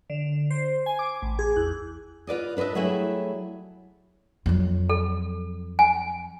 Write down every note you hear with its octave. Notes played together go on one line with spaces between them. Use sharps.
D3
C5
G#5
D6
A1
G#4
E2
F4 B4 D5 D#5
D4 B4 C#5 D#5 E5
F#3 G3 A3 E4 G#4
F2 F#3
A4
G#5